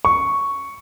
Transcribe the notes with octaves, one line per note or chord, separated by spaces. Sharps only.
C#6